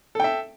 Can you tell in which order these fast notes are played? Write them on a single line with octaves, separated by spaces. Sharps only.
A4 G5 E5